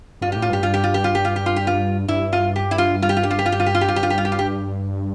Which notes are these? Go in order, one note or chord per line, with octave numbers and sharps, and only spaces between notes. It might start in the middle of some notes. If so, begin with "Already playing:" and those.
G2 F4
A2 G4
F4
G2 G4
F4
G4
F4
G4
F4
G4
F4
G4
F4
G4
F4
G2 E4
F4
G4
E4
F4
F4
G4
F4
G4
F4
G4
F4
G4
F4
G4
F4
G4
F4
G2 G4
F4
G4
F4
G4
F4
G4